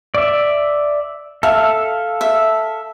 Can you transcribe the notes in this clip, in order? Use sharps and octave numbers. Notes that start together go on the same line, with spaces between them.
D5 E5
A4 E5 F5
E5